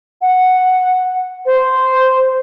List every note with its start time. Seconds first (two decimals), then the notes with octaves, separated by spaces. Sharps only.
0.22 F#5
1.46 C5